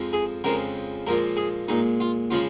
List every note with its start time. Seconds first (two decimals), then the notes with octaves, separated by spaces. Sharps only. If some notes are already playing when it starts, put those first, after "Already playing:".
Already playing: F2 F3 G#3
0.13 G#4
0.44 F2 C#3 F3 G#3 A#4
1.07 A#2 F3 G#3 A#4
1.37 G#4
1.68 A#2 G#3 D#4
2.00 F4
2.31 C#3 F3 G#3 F4